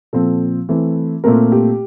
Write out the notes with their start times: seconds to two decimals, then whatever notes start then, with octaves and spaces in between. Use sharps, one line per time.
0.13 A#2 F3 C4 A4
0.69 E3 A3 C4
1.24 A#2 A3 C4 A#4
1.52 G4